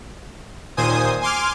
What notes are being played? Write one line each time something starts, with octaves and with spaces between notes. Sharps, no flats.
D#2 A#2 C5 G#5 D#6
G#5 C6 D6 F6